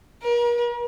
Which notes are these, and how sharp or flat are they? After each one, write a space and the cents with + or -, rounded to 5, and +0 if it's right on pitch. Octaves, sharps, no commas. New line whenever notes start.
A#4 +40